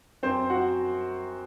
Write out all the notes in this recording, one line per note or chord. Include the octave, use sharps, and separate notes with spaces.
F#2 C4 C5
F#4 F#5